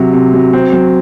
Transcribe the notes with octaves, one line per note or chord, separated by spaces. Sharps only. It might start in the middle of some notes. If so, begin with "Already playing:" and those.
Already playing: C3 F#3
C3
F#3
C4
F#3